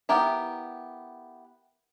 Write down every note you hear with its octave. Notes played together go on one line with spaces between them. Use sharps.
B3 E4 G4 A#4 E5